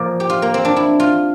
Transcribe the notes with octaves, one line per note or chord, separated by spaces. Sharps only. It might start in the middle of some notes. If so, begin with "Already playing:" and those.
Already playing: A#2 F3 A#3 D5
G4
F4
A#3
C4
D4
E4
F4